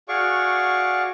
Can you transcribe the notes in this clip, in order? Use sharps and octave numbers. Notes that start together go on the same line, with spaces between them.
F#4 G#4 D5 F5 C#6